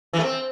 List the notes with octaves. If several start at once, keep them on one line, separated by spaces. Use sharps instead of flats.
E3
A3
C4